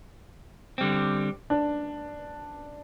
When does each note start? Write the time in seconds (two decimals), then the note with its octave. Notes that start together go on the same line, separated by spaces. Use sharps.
0.78 D3 G3 C4
1.50 D4